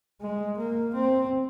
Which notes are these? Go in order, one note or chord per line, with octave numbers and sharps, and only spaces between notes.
G#3
A#3
C4